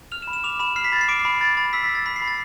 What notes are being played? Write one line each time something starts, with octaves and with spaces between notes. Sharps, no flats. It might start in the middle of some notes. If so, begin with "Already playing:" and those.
F6 F7
E7
B5
E7
D6 F7
B5 E7
F6 C7
B6
B5 A6
C7
D6 D7
C7
B5
B5 A6
B5 A6
E6 B6
B6
E6
A6
B5 B6
C7
B5
A6